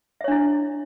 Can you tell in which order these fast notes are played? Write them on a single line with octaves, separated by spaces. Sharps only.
E5 C#5 D4 E4